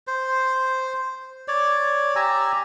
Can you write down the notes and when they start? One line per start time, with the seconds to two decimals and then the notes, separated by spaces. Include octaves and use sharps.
0.07 C5
1.48 C#5 D5
2.16 G4 G#5 A#5 E6